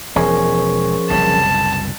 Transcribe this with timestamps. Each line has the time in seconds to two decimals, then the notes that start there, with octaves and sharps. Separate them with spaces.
0.16 E1 F3 C#4 G#4 A#4
1.10 F#1 C2 B2 A5